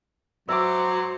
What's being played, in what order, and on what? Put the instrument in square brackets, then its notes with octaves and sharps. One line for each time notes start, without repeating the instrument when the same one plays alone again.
[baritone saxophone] F#3 [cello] F#4 C5 [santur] E5 D6